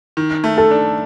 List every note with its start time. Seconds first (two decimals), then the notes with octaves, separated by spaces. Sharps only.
0.17 D#3
0.44 A3
0.58 A4
0.71 D4